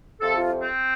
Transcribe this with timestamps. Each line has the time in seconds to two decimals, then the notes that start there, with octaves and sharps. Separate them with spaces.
0.21 F2 C3 F3 A4
0.35 F4
0.63 C4